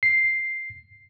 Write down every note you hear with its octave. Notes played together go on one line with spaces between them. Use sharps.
C7